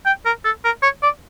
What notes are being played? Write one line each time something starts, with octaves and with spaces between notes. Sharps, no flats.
G5
A#4
A4
A#4
C#5
D5